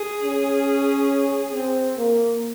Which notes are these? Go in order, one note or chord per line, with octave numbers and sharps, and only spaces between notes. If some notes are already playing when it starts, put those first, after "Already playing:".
Already playing: G#4
C#4
C4
A#3